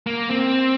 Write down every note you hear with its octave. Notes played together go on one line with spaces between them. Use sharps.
A#3
C4